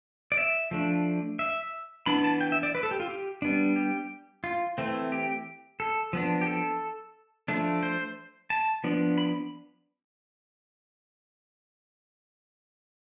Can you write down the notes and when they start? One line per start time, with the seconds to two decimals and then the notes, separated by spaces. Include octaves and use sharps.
0.32 D5
0.37 E5
0.71 F3 A3 D4
1.39 E5
2.06 E3 B3 D4 B5
2.24 A5
2.41 G5
2.52 E5
2.63 D5
2.75 B4
2.83 A4
2.91 G4
3.00 F4
3.08 G4
3.42 G3 B3 D4
3.76 G4
4.44 F4
4.78 E3 A3 C4
5.12 G4
5.80 A4
6.13 F3 B3 D4
6.41 G4
6.47 A4
7.48 F3 A3 D4
7.83 C5
8.50 A5
8.84 F3 B3 D4
9.18 B5